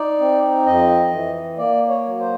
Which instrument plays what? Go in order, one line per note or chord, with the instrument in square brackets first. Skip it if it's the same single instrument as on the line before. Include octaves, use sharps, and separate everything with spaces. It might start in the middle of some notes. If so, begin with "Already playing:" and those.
Already playing: [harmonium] D#4 D5
C4
F2 D#5
E3
A#3 D5
C#5
F#3
C5